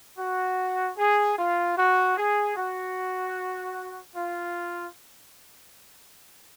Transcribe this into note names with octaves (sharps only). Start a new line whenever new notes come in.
F#4
G#4
F4
F#4
G#4
F#4
F4